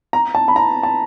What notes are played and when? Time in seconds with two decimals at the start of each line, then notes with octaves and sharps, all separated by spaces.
0.13 A#5
0.35 A5
0.48 B5
0.56 A#5
0.83 A5